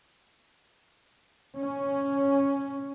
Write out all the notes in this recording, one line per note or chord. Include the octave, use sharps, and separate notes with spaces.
C#4